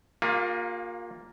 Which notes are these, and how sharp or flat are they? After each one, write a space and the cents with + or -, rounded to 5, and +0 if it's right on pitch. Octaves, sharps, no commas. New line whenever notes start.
A#3 +0 F4 +35 G#4 -45